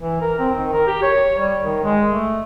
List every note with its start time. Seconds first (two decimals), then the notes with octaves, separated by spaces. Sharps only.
0.01 E3
0.21 A#4
0.39 C4
0.55 D#3
0.73 A#4
0.87 G4
1.02 C#5
1.38 G3
1.61 D#3
1.84 G#3
2.08 A3